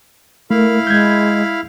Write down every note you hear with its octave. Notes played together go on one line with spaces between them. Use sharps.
A3 E4 A#4 F5 B5
G#3 G6 G#6